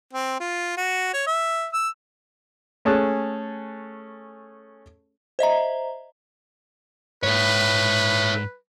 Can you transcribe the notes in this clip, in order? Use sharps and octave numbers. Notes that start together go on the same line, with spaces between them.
C4
F4
F#4
C#5
E5
E6
A3 C#4 G#4 A5 F#6
C5 D#5 E5 A#5
G#2 A4 B4 C#5